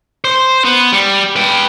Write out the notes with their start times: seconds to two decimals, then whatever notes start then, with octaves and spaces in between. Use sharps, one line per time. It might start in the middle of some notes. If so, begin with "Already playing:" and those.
0.24 C5
0.65 B3
0.92 G3
1.36 B4 G5